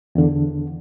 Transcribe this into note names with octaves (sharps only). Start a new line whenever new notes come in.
E2 D3